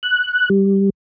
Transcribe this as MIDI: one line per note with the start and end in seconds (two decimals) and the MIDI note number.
0.03 0.49 90
0.50 0.90 55